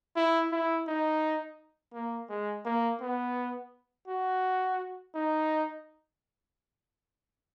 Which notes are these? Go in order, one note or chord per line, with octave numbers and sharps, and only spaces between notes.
E4
E4
D#4
A#3
G#3
A#3
B3
F#4
D#4